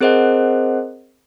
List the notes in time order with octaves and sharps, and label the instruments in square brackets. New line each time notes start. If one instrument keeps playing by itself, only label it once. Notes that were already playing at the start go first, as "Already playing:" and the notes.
[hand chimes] C4 G#4 A#4 C5 D#5 F#5